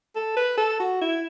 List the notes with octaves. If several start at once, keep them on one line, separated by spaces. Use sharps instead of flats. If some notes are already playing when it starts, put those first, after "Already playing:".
A4
B4
A4
F#4
E4